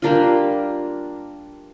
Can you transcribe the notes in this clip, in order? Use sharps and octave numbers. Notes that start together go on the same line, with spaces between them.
G3 A#3 D4 F4